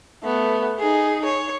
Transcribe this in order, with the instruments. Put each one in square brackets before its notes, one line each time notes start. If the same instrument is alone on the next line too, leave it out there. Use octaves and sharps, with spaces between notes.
[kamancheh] A3 B3
D#4 G#4
C#5